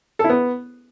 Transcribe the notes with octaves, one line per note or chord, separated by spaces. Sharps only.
A4
E4
B3